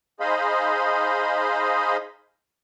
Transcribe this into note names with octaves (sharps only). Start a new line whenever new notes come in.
D#4 G#4 C5 D#5 F5 B5